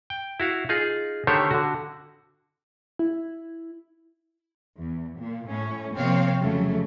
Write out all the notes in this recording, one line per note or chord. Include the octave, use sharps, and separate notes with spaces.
G5
E4 F#4 F5
D#4 F4 G#4
D3 D#3 A3 G4 C5 C#5
D3 F#4
E4
E2
A#2
A2 C#4
C3 F3 A#3 C4 C#5 F5
F2 C#3 F#3 A3